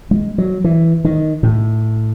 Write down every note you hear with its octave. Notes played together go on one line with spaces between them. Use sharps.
G#3
F#3
E3
D#3
A2